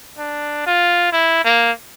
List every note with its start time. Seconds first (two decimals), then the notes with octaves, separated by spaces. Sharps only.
0.18 D4
0.66 F4
1.12 E4
1.45 A#3